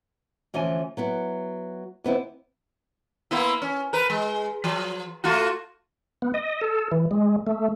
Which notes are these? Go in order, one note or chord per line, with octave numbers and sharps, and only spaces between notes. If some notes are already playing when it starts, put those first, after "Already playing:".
D2 E3 F3 C#4 G#5
F#3 B3 E4
D#2 B3 C4 E4
A#3 B3 E4
C#4
A#4 B4
G#3
F3
A3 F4 F#4
B3
D#5
A4
E3
G#3
A3